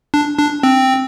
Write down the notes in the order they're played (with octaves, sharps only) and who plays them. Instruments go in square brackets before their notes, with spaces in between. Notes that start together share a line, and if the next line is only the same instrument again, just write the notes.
[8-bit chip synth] D4
D4
C4